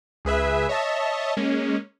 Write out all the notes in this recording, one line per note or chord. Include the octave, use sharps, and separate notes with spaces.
C#2 G#4 B4 E5
C#5 D#5 E5 A5
G#3 A#3 C#4